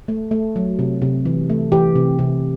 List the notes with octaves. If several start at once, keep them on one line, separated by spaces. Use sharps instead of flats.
A3
A3
F#3
C3
C3
E3
A3
E3 G4
C3
C3